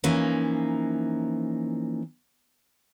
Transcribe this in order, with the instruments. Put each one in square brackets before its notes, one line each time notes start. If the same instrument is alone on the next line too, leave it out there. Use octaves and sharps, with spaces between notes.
[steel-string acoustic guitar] E3 F3 A#3 C#4 D#4